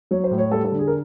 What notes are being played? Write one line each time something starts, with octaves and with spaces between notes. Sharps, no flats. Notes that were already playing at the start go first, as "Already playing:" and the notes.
F#3 C#5
C5
A2
C#5
G3 A4
A4
D3
G#4
A#4